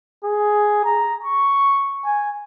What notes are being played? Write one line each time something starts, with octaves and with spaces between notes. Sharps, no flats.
G#4
A#5
C#6
G#5